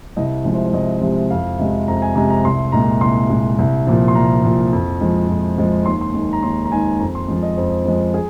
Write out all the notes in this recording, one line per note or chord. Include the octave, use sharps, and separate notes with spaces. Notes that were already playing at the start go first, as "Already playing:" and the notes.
C2 D#5
C3 F3 G#3
C5
C5
C2 D#5
C3 F3 G#3
F2 F5
C3 G#3
F2 A#5
G#5
C3 G#3 A#5
A#5
C2 C6
A#2 G#3 A#5
C2 C6
A#2 G#3
C2
A#2 F3
C6
C2 A#5
A#2 F3
F2
F3 G#3
F2
F3 G#3
D#2 C6
C6
D#3 G#3
A#5
D#2 C6
A#5
D#3 G#3 G#5
F2 A#5
C6
F3 G#3
D#5
F2 C5
F3 G#3
G#4